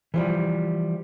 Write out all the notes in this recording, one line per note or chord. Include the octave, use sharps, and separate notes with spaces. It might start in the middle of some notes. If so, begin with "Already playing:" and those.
E3 F3 G3